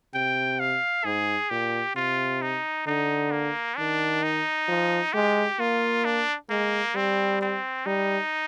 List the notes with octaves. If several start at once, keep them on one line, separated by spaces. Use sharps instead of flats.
C3 G5
F5
G#2 G#4
A#2 G4
C3 F4
D#4
D3 D#4
A#3
D#3 D4
D#4
F3
G#3 G4
A#3 F4
D4
G#3 A#3
G3 C4
C4
G3 D#4